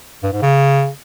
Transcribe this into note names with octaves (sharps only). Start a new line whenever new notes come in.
G2
G#2
C#3